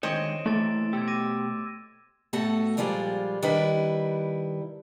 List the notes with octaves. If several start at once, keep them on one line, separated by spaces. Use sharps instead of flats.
D3 D#3 G#3 C4 C#5 D#5 D7 E7
E3 A3 A#3 E4 C6 A6
B2 G4 E6 G#6
D6 A#6 D#7
A2 A3 B3 F#4 A4 A5
A#2 F3 G3 G#3 F4 D5
D#3 G3 D4 E4 B4